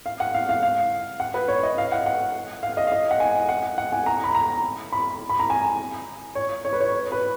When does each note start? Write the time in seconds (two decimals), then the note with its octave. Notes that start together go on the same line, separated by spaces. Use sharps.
0.06 F5
0.20 F#5
0.34 F5
0.49 F5
0.63 F5
1.20 F#5
1.34 B4
1.48 C#5
1.63 D#5
1.78 F5
1.92 F#5
2.06 F#5
2.63 F5
2.77 D#5
2.87 F5
2.92 D#5
3.11 F#5
3.20 G#5
3.49 F#5
3.78 F#5
3.92 G#5
4.06 A#5
4.24 B5
4.35 A#5
4.92 B5
5.30 B5
5.40 A#5
5.50 G#5
6.35 C#5
6.65 C#5
6.73 B4
6.81 C#5
7.12 B4